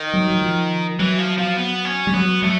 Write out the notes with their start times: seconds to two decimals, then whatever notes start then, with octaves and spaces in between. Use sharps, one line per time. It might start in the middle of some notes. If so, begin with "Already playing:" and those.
Already playing: D#3
0.13 F#3
0.30 F#3
0.41 F3
0.99 E3 F#3
1.19 F3
1.38 F3
1.57 B3
1.85 C#4
2.07 G3
2.14 F#3 B3
2.42 F#3 A3